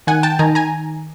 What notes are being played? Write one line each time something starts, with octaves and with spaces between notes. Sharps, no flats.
D#3 F#5 G#5
G5 A5
D#3 G#5 A#5
G#5 A#5